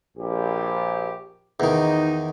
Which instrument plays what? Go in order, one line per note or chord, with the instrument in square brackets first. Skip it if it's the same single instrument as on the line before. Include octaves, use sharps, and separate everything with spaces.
[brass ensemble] A#1 G4
[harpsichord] E2 D#3 [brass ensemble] D#4